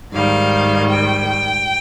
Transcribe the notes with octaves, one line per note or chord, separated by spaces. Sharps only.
G#2 D#3 G3 F5
G5